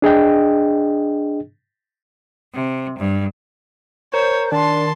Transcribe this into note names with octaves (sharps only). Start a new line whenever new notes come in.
D4 G#4 D#5 G5
C3
G2
A#4 C5 C#5
D#3 D4 A5 C6